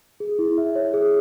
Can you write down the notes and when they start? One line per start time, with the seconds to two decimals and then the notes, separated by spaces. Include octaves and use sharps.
0.20 G#4
0.39 E4
0.58 E5
0.75 C#5
0.94 G#4